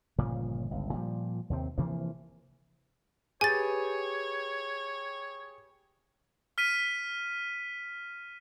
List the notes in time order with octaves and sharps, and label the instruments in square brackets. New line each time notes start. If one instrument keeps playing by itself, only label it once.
[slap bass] G1 A#2 C#3 F3
G1 C#2
A#2 F3 G3
D#2 C3 C4
C3 E3 F3 A#3
[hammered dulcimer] G4 B4 G5 [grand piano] G#4 [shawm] C#5 [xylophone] G#5 A6
[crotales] F6 B6 D#7